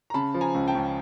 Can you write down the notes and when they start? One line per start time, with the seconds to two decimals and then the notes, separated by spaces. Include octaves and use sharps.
0.10 A#5
0.14 C#3 A5 B5
0.34 F3
0.41 G#5 A#5
0.55 C#2
0.68 G5 A5
0.75 C#2